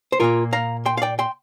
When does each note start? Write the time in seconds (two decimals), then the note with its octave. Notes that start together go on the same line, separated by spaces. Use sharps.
0.12 C5
0.20 A#2 A#3 F4 A#4
0.53 F5 A#5
0.86 G5 C6
0.97 F5
1.02 D5 G5
1.19 G5 C6